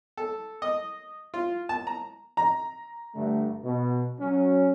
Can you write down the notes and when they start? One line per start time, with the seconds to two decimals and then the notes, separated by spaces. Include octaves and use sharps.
0.17 A4
0.62 D#5
1.34 F4
1.69 A5
1.87 A#5
2.37 A#5
3.15 G2 D3 A3
3.63 B2
4.20 F#3 C#4